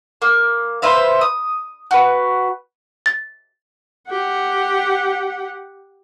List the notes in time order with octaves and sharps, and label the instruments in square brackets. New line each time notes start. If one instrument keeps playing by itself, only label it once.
[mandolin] A#3
B4 C5 E5 F5
D#6
F#4 B4
[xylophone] A6
[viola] G4 F#5